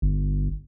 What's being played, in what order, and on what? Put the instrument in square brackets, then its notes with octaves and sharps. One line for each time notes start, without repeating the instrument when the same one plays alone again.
[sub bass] G1